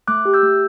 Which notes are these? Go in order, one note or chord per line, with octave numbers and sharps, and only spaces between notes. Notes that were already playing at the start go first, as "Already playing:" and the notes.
A3 D6 F#6
G4
E6 G6
A3